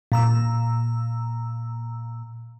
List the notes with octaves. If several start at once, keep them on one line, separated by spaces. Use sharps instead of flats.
A#2 A#5 E6